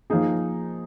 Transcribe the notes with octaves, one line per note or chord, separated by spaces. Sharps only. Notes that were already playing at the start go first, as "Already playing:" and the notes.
F3 A#3 D#4 G#4